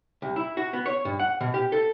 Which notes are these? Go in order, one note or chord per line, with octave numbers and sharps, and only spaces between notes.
C2
E4
F#4
B3
C#5
G2
F#5
B2
G4
A4